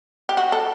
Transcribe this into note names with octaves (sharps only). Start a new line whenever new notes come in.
G4
F#4
A4